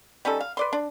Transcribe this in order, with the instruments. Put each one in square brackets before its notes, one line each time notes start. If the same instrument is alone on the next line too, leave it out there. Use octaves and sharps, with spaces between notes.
[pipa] G3 C#4 D#4 A4
F5
B4 D5 C6
D4